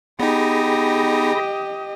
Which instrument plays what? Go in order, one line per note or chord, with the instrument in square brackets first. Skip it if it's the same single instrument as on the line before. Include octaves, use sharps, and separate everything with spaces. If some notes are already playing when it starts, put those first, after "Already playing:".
[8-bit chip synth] B3 D#4 [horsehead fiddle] G4 D#5 [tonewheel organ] G#4 B5 A#6